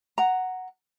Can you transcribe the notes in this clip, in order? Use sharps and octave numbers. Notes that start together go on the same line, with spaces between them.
F#5 A#5